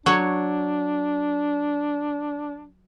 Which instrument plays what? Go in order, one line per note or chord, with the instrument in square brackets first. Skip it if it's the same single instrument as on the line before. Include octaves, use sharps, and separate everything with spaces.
[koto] F#3 C#5 [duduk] D4